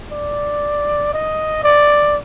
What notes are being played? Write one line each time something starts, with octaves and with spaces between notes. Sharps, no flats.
D5
D#5
D5